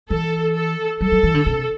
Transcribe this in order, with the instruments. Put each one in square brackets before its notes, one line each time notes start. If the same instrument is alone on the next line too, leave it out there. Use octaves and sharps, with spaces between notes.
[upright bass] E3 [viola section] A4
[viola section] A4
[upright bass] F#3 [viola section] A4
[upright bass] F#3
E3
D3
C3